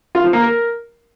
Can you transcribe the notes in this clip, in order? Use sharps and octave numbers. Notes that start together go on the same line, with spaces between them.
F4
F3
A#3
A#4